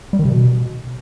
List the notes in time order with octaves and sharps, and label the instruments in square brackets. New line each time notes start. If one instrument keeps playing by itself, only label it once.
[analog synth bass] G3
D#3
C3
B2